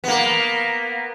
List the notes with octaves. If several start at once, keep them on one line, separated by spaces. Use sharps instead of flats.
A#3 B3